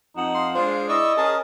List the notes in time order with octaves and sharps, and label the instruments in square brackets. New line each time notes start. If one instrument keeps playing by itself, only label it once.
[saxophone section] F2 F#5 [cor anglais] D#4
[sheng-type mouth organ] F5 [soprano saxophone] C6
[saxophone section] G#3 D4 G#4 [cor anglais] F4 [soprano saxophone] C5
[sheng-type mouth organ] E4 C#6 E6 [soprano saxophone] D5 [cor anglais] D#5
[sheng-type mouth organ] C#4 A#4 [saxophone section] G#4 [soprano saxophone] A5